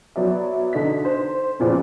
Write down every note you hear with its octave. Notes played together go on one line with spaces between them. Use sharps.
F#3 B3 D5 E5
D3 D#4 B6
C5
F2 A#2 C#3 F3 B3